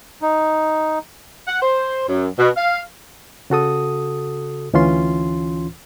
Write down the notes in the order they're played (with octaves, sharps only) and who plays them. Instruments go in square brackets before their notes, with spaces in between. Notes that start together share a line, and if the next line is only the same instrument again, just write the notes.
[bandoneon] D#4
[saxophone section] F#5
C5
F#2
B2
F5
[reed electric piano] C#3 F#4 A4 D#6
D2 E3 C#4 F4 C6